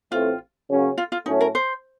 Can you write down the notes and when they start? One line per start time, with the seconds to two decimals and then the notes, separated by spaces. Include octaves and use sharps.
0.12 A1 A2 A3 C4 F4
0.69 C#3 F#3 A#3 C#4
0.98 F4
1.12 F4
1.26 A2 F#3 A3 C#4 D#4 A4
1.41 A#4
1.55 C5